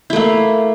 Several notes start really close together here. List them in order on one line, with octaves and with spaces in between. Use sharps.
E4 A3 A#3